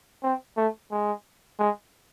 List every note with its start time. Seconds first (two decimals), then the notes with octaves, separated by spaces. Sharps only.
0.23 C4
0.57 A3
0.92 G#3
1.59 G#3